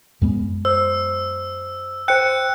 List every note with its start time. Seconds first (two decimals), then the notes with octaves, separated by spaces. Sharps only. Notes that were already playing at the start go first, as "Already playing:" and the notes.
0.22 F#2 G#3 B3
0.65 C5 E6
2.08 C5 G5 F#6 C#7